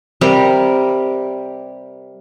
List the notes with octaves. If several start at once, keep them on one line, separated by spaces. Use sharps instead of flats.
C3 G3 G4 A#4